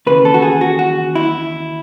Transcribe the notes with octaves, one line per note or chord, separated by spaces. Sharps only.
D#2 C#3 E3 B4
A4
F#4
G#4
F#4
F#4
E4